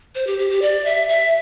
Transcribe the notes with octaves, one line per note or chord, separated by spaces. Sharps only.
C5
G4
G4
G4
D5
E5
E5